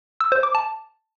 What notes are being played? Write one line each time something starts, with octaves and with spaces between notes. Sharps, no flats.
E6
C5
D6
A5